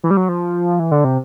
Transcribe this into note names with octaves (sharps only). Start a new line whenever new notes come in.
E3
G3
F#3
F3
E3
D3
C3